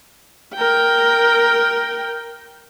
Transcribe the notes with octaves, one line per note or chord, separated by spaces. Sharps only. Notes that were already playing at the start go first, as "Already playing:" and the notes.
A#4 G5